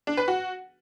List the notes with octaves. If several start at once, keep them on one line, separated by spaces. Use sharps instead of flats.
D4
B4
F#4